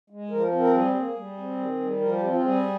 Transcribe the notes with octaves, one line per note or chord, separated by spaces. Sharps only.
G#3
F3 A#4
C4
A#4
G3 G#4
A#3
G3
C4
D#3
G3
F3 A#4
G4
C4 F4
F4
G3 G#4